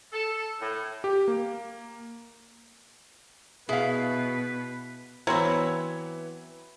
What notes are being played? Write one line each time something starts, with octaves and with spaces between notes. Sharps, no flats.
A4
A2
G4
A#3
B2 E4 G#4 B4 F5
E3 F#3 B3 C4 E4 G#6